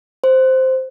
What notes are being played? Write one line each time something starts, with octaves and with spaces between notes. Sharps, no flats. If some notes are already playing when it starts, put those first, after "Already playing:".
C5